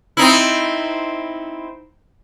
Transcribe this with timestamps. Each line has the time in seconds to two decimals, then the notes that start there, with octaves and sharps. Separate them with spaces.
0.17 C4 D#4 E4